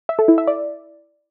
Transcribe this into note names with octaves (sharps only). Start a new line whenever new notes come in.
E5
A4
E4
E5
D5